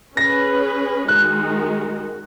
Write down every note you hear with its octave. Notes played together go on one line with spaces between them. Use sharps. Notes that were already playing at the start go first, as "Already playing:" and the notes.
C#4 G#4 B4 A#6
D#3 G#3 D#4 F#4 F#6